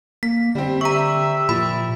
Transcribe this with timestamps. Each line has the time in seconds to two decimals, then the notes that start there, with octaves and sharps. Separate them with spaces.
0.23 A#3 B6
0.55 D3 G3 C4
0.81 G4 E5 A#5 C#6
1.49 A#2 F3 B5